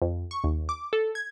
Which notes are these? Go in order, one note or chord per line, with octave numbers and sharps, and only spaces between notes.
F2
C#6
D#2
D6
A4
G#6